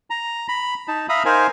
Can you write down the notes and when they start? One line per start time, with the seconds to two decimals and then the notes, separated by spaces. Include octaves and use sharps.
0.10 A#5
0.48 B5
0.88 D#4 A5
1.09 E5 F5 A#5 B5 D#6
1.25 D#4 A#4 C5 F5 G#5